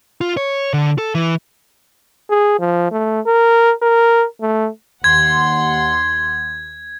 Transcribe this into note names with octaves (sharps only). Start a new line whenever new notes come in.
F4
C#5
D3
A4
E3
G#4
F3
A3
A#4
A#4
A3
D#2 F#5 C6 G#6